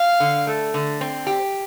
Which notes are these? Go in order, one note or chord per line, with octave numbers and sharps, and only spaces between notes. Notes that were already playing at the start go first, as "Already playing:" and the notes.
Already playing: F5
D3
A3
D3
C4
G4